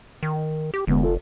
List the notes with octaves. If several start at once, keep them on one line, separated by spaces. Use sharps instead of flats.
D#3
G4
F1 D3 G#3 B3
F4 A4